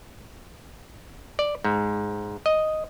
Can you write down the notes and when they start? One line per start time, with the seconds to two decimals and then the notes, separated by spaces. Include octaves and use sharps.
1.39 D5
1.64 G#2
2.46 D#5